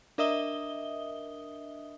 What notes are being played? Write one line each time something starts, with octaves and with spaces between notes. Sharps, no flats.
D4 A#4 D#5 E5 D#6 G7